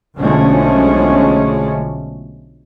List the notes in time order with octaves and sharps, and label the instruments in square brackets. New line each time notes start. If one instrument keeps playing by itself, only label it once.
[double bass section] B1 D3 F3 G#3 A3 C#4